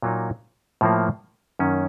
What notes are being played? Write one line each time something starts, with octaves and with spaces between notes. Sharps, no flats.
A#2 F#3 A#3 D#4
A2 F3 A#3
F#2 D#3 A#3 C#4